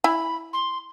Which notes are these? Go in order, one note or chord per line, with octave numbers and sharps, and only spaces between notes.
E4 G#5 B5
C6